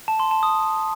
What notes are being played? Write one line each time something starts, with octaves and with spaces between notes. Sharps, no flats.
A5
C6
A5
D#6